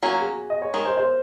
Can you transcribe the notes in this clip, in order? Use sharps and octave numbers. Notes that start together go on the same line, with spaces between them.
F#3 A#3 C#4 F#4
G#4
D#5
C#5
D#3 G#3 A#4
C5
C5